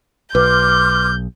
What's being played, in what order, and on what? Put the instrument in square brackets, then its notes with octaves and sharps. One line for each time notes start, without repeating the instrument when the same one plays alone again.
[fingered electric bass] B1 [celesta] B4 [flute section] C6 D6 F6 [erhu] G6